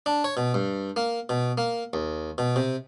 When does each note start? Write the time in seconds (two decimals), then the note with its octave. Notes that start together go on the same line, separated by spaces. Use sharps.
0.06 D4
0.24 C#5
0.37 B2
0.54 G2
0.96 A#3
1.29 B2
1.58 A#3
1.93 D#2
2.38 B2
2.56 C3